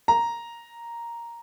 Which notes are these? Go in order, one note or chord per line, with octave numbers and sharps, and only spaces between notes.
A#5